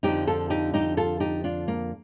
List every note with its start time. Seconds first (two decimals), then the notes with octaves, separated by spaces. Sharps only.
0.03 F2 D3 F3 D#4 G4
0.27 F4 A4
0.50 D#4 G4
0.74 D#4 G4
0.97 F4 A4
1.20 D#4 G4
1.44 D4 F4
1.68 A#3